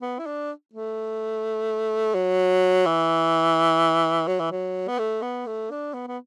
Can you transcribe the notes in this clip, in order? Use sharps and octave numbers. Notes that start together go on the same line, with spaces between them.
B3
E4
D4
A3
F#3
E3
F#3
E3
F#3
B3
A3
B3
A3
D4
B3
B3